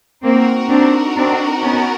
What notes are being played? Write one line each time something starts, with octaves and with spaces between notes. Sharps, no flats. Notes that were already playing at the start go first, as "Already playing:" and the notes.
A#3 C4 D#4 F#4 A#4
C4 D4
C4 D4
B3 C#4